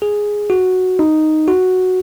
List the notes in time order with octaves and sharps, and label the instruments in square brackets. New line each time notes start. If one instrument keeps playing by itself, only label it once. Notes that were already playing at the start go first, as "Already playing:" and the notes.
[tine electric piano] G#4
F#4
D#4
F#4